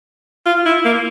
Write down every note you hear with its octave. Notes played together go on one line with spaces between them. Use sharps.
F4
E4
A#3